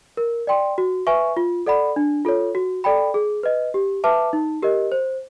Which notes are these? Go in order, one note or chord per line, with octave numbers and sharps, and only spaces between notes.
A#4
D5 G5 C6
F#4
B4 E5 G#5 C#6
F4
A4 D5 F#5 B5
D4
F4 A4 C#5
F#4
A4 D5 G5 B5
G#4
B4 D#5
G4
B4 E5 A5 D6
D#4
G4 A#4 D#5
C5